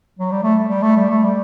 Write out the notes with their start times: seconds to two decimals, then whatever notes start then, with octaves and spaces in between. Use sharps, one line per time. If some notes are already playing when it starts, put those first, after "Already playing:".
0.19 F#3
0.32 G3
0.43 A3
0.68 G3
0.82 A3
0.96 G3
1.10 A3
1.24 G3